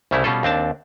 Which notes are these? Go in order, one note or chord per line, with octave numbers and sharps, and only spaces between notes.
C2 C#3 G3 A3 E4
B2 G3 C#4 F4 A4
D#2 C4 D4 A5